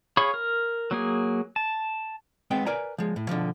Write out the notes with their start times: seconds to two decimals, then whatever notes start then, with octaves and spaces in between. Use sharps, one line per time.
0.17 G#4 C#5 F5 B5 C#6
0.34 A#4
0.91 F#3 A#3 G#4
1.56 A5
2.51 G#3 B3 C4 G5
2.66 A#4 B4 D5 G#5 A#5
2.98 F3 G#3
3.16 A2
3.29 B2 D3 E3 F3